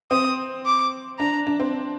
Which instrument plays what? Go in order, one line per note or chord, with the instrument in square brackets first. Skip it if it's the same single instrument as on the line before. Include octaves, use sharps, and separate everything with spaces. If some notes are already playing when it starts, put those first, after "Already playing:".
[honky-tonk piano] C4 [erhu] D#6
[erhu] D6
[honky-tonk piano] D4 [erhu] A#5
[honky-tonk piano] D4
C4